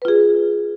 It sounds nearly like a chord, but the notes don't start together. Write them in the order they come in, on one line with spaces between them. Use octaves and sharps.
B4 F4 G#4